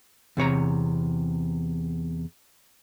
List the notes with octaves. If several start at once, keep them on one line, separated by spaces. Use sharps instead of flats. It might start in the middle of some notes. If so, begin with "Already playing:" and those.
E2 C3 C#5 A#5